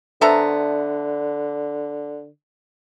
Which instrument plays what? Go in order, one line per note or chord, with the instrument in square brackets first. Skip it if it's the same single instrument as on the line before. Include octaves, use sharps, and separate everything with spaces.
[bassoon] D3 [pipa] B3 A4 A#5 [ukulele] D4 C5 E5